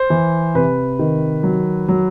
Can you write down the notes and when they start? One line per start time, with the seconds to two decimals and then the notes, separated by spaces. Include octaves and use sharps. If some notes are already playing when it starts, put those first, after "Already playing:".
Already playing: C5
0.10 E3
0.55 C3 B4
0.99 D#3
1.43 F#3
1.88 F#3